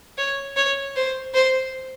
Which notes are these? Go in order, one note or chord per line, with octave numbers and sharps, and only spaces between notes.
C#5
C#5
C5
C5